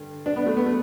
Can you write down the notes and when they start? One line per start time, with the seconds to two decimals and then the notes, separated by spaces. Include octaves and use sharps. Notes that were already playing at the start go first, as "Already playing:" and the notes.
Already playing: G2 D3
0.26 D4
0.36 B3
0.46 A3
0.57 B3
0.66 A3